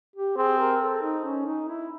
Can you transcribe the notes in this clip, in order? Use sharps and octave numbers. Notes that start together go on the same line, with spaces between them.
G4
C4 G#4
A#4
A4
D#4
C#4
D#4
E4